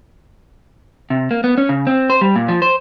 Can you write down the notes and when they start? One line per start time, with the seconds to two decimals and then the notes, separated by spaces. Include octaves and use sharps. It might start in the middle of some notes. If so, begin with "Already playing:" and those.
1.10 C3
1.31 A#3
1.44 B3
1.58 C#4
1.69 C#3
1.87 C4
2.10 C5
2.21 G3
2.36 A#2
2.48 F3
2.62 C5